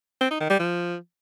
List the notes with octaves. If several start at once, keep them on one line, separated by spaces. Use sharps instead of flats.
C4
D#4
D#3
G3
F3